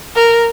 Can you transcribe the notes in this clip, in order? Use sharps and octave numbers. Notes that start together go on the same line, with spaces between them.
A#4